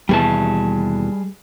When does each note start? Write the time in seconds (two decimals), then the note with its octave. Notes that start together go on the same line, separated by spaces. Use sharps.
0.09 D#2 B2 E3 G3 G#4 A5